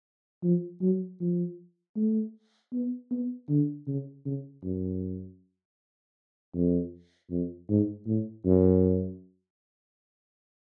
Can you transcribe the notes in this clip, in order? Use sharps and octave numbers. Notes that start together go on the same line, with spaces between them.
F3
F#3
F3
A3
B3
B3
D3
C#3
C#3
F#2
F2
F2
G#2
A2
F#2